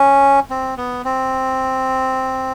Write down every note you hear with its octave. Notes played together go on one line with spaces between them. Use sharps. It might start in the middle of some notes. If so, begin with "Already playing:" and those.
Already playing: C#4
C4
B3
C4